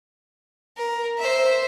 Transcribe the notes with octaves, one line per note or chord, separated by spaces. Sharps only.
A#4
C5 E5